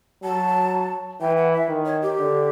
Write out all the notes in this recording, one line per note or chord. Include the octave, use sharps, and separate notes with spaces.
F#3 A5
E3 G5
F#5
E5
D#3
C#5
G4
D3